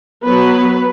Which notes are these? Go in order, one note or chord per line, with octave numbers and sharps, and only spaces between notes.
F#3 B3 B4